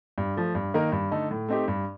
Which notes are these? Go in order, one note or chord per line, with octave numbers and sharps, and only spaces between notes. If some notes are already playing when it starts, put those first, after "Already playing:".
G2
F3 A3
G2
D#3 A#3 D#4 A#4
G2
D3 A3 D#4 A4
A2
A3 C4 D#4 G4
G2